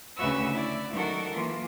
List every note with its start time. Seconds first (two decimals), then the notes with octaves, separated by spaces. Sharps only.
0.17 D2 C#3 F#4 B4 E5 E6
0.51 E4 D5
0.94 D#3 F#3 F#4 A4 A#4
1.34 E3 A#3 F4